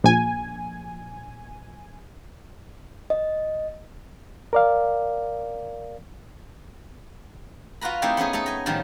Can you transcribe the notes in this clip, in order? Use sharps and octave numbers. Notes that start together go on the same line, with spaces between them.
A#1 G#5
D#5
A#4 D5 F5
F4 F#4 B4 A#5 B5
A3 C4 D#4 E4 G4
B3 C#4 D#4 G#4
A3 D#4 A4
D#5 G#5
A2 D#3 F3 G3 D#4